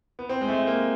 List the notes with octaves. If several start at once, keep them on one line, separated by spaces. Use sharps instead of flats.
B3
C4
G#3
A3
A#3